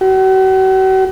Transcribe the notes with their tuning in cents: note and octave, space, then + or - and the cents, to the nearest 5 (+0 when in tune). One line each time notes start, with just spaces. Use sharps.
F#4 +45